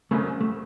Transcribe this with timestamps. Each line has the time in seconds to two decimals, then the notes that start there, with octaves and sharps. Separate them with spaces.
0.11 G#1 F#2 C#3 A3
0.41 A3